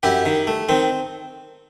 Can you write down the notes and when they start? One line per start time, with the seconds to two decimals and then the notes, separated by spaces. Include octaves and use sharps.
0.03 F#2 E4 G4
0.26 D#3
0.47 A3
0.69 D#3 C4